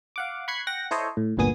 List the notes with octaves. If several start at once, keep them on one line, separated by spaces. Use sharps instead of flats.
F5 F#5 D6
B5 C#6 F#6 G#6 C7
F#5 G5 A#6
E4 A4 C5 C#5 D#5
A2
G1 D2 A#2 B3 G#4 D#6